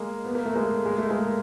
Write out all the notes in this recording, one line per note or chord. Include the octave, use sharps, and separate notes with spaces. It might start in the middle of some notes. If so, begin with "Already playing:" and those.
Already playing: G#3 A#3
B3
A#3
A3
G#3 A#3
G#3
A3
G#3 A#3